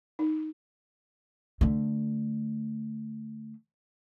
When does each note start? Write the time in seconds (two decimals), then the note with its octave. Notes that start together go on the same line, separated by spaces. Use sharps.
0.19 D#4
1.61 D3 A3